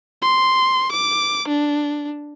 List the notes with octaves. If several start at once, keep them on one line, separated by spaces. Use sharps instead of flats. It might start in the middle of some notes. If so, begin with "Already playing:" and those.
C6
D6
D4